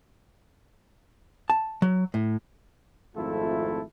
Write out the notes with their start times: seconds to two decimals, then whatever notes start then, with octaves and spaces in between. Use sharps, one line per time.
1.50 A5
1.82 F#3
2.14 A2
3.16 G#1 F2 A3 E4 F4 A4